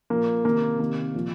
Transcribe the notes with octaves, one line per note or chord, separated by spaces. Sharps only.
A#2 F3 A#3
C3 D#3 A#3
C3 D#3 A#3
A#2 F3